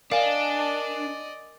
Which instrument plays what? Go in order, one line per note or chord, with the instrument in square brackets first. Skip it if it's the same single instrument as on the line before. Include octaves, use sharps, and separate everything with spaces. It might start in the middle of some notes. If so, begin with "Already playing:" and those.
[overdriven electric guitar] D4 [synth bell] A#4 G#5 [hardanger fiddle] D5 D#5 [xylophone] F5